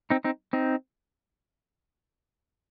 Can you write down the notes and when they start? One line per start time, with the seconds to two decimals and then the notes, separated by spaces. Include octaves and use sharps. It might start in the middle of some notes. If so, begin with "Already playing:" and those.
0.10 C4 D#4
0.24 C4 D#4
0.53 C4 D#4